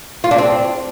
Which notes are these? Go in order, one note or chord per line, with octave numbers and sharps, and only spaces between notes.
F4
D4
C4